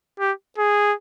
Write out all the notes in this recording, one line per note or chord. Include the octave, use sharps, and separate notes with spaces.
G4
G#4